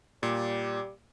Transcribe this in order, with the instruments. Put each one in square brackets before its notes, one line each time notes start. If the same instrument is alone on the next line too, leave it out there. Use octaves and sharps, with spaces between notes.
[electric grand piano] A#2 [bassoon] G3